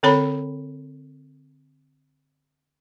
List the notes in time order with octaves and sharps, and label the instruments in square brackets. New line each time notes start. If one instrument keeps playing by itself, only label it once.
[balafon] D3 C4 A4 C#5 A#5 B5